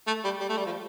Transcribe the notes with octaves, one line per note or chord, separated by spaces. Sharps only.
A3
G3
G3
A3
G3
F3